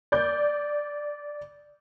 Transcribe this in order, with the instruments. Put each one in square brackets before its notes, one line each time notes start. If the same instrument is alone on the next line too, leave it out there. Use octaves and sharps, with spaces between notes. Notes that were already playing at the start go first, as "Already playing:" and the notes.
[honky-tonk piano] D5 G6